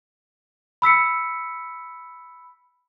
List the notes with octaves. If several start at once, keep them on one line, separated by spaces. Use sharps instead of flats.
B5 E6 B6 C#7